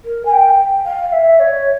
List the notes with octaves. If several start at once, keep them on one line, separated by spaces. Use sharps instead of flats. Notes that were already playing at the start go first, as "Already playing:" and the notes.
A#4
G#5
G5
F5
E5
C#5